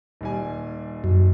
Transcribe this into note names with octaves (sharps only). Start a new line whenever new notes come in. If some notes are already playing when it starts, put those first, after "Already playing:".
D#1 G3 G#5
F#2